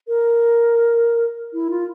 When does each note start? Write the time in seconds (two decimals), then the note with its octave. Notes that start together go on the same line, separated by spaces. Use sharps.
0.08 A#4
1.54 E4
1.70 F4